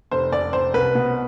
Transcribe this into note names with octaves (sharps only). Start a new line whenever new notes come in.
F1 C5
F1 D5
F1 C5
C2 B4
B2